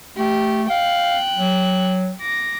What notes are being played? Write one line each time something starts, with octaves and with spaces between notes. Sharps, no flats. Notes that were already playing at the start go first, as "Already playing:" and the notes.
A3 G4
F5 G5 F#6
F#3
D6 A#6